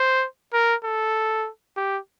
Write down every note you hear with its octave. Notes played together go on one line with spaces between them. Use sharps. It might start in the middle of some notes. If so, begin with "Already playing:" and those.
Already playing: C5
A#4
A4
G4